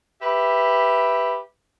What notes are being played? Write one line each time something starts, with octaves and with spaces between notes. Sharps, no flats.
G4 B4 E5